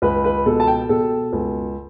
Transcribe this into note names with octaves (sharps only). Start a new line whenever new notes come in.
C#2 B4
B4
B2 A4
A5
G5
B2 A4
C#2